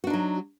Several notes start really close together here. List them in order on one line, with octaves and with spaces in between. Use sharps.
F#4 D4 D#4 F#3